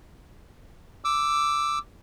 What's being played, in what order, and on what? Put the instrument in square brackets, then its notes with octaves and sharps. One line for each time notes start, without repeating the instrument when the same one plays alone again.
[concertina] D6 E6